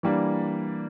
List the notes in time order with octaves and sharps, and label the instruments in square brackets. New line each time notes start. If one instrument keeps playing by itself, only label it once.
[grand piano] E3 G3 A#3 D4